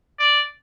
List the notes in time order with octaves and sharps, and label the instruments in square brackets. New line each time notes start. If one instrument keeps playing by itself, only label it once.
[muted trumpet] D5